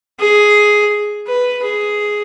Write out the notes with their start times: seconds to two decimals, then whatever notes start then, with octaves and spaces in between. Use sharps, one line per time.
0.20 G#4
1.27 B4
1.63 G#4